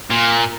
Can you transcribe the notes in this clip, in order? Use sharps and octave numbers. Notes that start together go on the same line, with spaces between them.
A#2